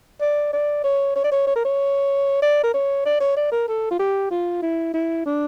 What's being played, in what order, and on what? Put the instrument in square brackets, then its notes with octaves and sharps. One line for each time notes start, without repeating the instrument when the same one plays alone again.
[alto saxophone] D5
D5
C#5
C#5
D5
C#5
C#5
A#4
C#5
D5
A#4
C#5
D5
C#5
D5
A#4
A4
F4
G4
F4
E4
E4
D4